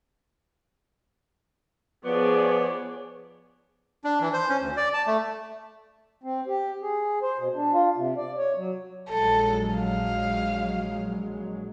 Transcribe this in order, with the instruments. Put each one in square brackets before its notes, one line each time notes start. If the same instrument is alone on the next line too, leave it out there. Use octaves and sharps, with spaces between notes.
[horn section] F3 B3 [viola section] G#4 C#5 D5
[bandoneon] D4
E3
C5
C#4
D2
D5
A5
A3
[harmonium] C4
G4
G#4
C5
B2
D4
F4
C3
D5
C#5
F#3
[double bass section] A#1 F#3 G#3 [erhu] A4
[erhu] F5